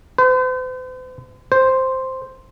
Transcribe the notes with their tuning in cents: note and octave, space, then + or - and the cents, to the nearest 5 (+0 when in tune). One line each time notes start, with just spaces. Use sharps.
C5 -45
C5 +0